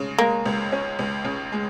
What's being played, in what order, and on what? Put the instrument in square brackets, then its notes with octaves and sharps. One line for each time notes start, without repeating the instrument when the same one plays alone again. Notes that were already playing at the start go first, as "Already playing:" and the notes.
Already playing: [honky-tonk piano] C#3 G#3
[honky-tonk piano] G#3 [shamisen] A#3
[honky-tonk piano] C#2
C#4
C#2
C#3
G#3